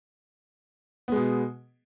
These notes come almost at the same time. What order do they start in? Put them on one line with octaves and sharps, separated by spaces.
B3 G#3 B2